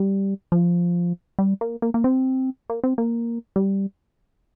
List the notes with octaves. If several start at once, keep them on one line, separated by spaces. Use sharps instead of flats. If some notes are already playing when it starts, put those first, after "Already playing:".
Already playing: G3
F3
G3
A#3
A#3
A#3
C4
A#3
C4
A#3
G3